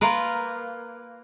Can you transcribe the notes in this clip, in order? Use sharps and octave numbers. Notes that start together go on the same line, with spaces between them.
A#3 F4 A#4 B4